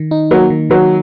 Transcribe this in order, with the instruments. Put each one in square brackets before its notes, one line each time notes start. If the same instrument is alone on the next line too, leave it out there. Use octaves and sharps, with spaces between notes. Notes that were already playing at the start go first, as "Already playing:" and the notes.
Already playing: [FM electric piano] D#3
D#4
[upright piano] F#3 [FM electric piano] A#3
[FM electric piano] D#3
[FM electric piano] D#3 [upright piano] F#3